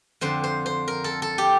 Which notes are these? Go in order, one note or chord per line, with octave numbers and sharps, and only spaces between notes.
F2 D3 C5
C5
C5
A#4
A4
A4
G4